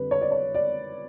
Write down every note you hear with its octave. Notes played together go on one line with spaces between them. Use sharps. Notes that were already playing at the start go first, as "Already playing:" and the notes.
Already playing: F2 D3 G3 B4
C#5
D5
C#5
D5